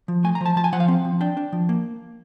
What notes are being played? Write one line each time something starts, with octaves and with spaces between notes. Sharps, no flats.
F3
A3 G#5
A#5
F3 A5
F3 A5
G#5
F3 F#5
F5
C4
F3
D4 G5
D4
F3
A#3